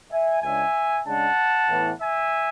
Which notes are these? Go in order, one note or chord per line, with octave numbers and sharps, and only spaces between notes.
E5 G#5
C#2 C#3 G#3 D4 E5 G#5
C#3 G#3 D4 F#5 A5
A2 E3 B3
E5 G#5